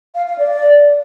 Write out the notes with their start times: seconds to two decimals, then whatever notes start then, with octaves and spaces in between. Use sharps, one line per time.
0.15 F5
0.27 F5
0.38 D5